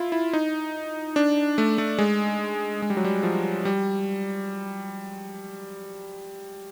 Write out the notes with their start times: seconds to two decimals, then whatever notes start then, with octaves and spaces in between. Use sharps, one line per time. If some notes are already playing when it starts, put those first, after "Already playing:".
Already playing: E4 F4
0.12 E4
0.33 D#4
1.16 D4
1.58 A3
1.78 A3
1.98 G#3
2.82 G#3
2.90 G3
2.97 F#3
3.05 G3
3.23 F3
3.65 G3